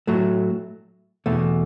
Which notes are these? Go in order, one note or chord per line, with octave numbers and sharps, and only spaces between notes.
A2 F#3 A3
E2 B2 A3